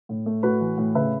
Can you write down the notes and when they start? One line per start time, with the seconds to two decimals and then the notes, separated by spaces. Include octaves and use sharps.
0.09 A2
0.26 A3
0.43 A2 F#4 B4
0.61 E3
0.77 A2
0.95 C#3 B4 E5